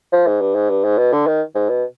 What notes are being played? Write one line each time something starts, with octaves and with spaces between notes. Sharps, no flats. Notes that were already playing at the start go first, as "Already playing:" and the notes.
F3
G#2
G2
G#2
G2
G#2
B2
D3
D#3
G#2
B2